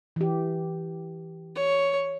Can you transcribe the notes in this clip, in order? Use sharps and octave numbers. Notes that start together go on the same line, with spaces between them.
E3 G4
C#5